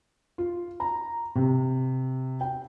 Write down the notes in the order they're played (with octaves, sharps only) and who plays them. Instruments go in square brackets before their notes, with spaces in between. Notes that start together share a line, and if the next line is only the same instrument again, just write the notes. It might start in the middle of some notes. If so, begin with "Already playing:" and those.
[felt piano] F4
A#5
C3
G5